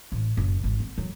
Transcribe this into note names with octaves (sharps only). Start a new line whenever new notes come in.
A1
F#1
G#1
C4
F#3